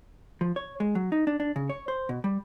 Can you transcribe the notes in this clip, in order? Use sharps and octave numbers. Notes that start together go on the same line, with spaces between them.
F3
C#5
G#3
F#3
D#4
D4
D4
C#3
C#5
C5
B2
G3